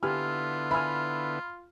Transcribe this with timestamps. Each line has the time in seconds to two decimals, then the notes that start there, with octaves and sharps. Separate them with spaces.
0.03 D3 B3 E4 F4 G4 G#5 F6
0.71 E5 G#5 B5 F6